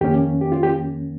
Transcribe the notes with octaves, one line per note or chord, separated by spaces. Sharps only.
F2 D#3 A#3 C#4 G4
G4
F4
G4